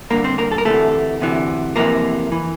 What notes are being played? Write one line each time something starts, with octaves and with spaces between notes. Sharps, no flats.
G2 D3 A#3 A#4
C4 C5
A#3 A#4
A4
A#4
D2 C3 E3 A3 A4
D2 C3 E3
F2 C3 E3 A#3 A#4
E3